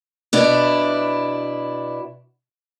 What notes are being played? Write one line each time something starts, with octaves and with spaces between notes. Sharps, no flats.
B2 D4 E4